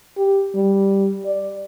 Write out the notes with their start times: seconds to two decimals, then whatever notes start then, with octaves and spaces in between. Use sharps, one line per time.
0.17 G4
0.55 G3
1.25 D5